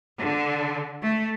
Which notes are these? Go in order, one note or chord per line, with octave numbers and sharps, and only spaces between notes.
D3
A3